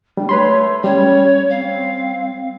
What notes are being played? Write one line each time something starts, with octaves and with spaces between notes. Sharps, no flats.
G3 D4
A3 B4 C#5 B5 C6
G3 C#4 C#5
C4 F5